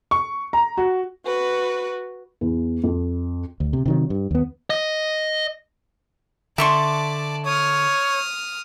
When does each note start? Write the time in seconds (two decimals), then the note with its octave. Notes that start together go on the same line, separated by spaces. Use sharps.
0.11 C#6
0.53 A#5
0.78 F#4
1.25 F#4 B4
2.41 E2
2.83 F2
3.60 D2
3.73 C3
3.86 C3 D#3 F#3
4.10 G2
4.31 D#2 B3
4.70 D#5
6.58 D3 D5 E5 A5 C6 C#6
7.46 C#5 D#6 F6